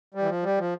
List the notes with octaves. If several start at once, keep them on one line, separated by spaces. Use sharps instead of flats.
G3
E3
F3
G3
F3